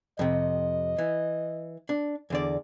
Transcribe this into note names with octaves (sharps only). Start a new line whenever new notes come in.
F2 C3 D#5
E3
D4
E2 D3 D5